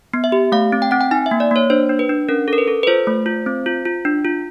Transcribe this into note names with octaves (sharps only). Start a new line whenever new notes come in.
B3
E5
G4
A3 F5
C4
G5
C4 F#5
G5
D#4 G#5
E5
A#3
D5
A#3 C#5
D4 C5
D4
B4
D4
C#4 A#4
A4
A#4
B4
A4
B4
F4 C5
A3
F4
C4
F4
F4
D4
F4